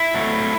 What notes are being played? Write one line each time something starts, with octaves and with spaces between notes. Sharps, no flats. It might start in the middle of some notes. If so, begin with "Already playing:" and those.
Already playing: E4
F#3 A3